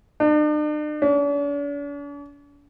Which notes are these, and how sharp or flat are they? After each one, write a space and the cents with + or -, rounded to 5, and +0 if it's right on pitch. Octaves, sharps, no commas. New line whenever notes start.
D4 +45
D4 -45